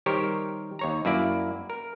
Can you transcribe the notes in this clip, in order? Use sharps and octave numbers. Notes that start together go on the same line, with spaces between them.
D#3 G3 G4 A#4 C5 C#5
D#2 C#5 A#5
F#2 A#3 E4 D5
A#4